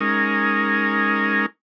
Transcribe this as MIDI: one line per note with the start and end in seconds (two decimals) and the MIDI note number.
0.01 1.46 56
0.01 1.46 61
0.01 1.46 63
0.01 1.46 70